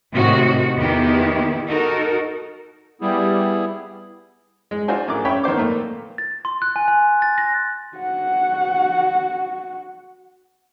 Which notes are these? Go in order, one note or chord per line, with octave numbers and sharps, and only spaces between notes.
A2 C3 D#3 F#4
E2 D#3 B3 E4 G4
D#4 F#4 A4 A#4
G3 B3 E4 G#4
G#3
D4 F4 F#4 C5 G#5
A1 G#4 A#4 D6
C#4 C#5 E5 G5 B5
D#3 B3 C5 D6
A#2 A3 A#3
A6
C6
F#6
G#5
G#5
A6
A#6
F#4 F#5